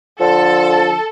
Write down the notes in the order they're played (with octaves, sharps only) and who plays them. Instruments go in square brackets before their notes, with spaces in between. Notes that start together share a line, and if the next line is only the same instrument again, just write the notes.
[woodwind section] D3 F3 [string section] A4